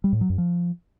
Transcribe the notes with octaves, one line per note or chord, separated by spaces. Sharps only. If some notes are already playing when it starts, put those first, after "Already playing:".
G3
A2
F#3
F#2
F3